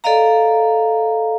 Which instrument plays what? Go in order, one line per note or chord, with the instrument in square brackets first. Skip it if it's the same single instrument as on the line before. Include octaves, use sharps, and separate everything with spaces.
[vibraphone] A4 D5 D#5 F5 A#5